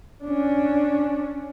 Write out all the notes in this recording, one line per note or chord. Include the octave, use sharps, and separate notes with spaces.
C#4 D4